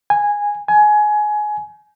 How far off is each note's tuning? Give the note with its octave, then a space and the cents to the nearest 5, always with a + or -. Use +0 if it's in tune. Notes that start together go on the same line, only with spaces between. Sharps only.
G#5 -10
G#5 +20